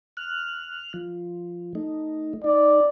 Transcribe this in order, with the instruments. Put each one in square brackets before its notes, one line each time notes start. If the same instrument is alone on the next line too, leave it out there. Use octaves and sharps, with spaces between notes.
[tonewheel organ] F6 F#6
F3
A3 D#4
[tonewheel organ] D#4 [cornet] D5